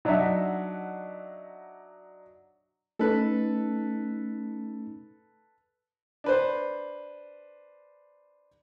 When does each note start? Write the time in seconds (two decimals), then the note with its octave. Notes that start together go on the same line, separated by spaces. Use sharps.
0.05 F#3 D4 D#4 E5 F#5
2.99 A3 C#4 D#4 A4 B4
6.24 D4 B4 C5